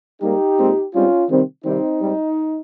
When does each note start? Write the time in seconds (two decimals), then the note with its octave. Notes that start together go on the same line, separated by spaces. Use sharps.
0.22 G#2 G3 A#3 D#4 G4
0.59 A#2 G#3 C4
0.94 G#2 G3 C4 C#4 F4
1.30 C3 D#3 G3 C4
1.64 C3 D#3 G3 C4 D#4
2.01 G#2 G3 C4